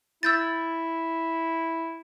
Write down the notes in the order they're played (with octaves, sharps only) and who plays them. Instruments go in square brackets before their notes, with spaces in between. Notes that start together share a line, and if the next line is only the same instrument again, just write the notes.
[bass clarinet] E4 [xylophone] E6 G6 A6